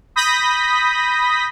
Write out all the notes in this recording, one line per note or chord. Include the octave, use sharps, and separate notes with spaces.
B5 D#6 G6 A#6 B6